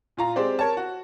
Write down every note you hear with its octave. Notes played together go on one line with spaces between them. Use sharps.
A#2 F4 A#5
G#3 C4 G4 C5 D5
A#4 C#5 A5
F#4